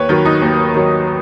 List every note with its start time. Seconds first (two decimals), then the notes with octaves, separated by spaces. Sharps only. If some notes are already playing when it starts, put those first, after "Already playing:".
Already playing: D#2 B4 C#5
0.09 D#3 F#3
0.25 D#4
0.42 D#2
0.74 D#3 F#3